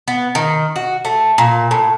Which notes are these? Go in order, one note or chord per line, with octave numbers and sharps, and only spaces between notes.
B3
D#3
F#4
A3
A#2
A2